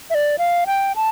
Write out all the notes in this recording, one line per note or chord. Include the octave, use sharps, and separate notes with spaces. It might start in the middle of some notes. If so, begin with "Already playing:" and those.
E5
D5
F5
G5
A5